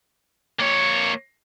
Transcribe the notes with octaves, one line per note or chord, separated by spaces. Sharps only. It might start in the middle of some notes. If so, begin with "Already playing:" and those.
A#3 C#5